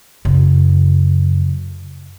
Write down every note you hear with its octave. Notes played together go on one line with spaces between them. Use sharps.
F#2 C#3